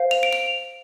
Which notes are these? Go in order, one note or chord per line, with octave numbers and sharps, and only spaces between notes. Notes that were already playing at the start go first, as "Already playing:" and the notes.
Already playing: C5 F5
F7
D7
F7